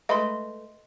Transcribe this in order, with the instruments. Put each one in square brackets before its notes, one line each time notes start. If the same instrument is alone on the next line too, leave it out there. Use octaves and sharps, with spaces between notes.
[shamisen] G#3 A3 B4 [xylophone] D#5 C6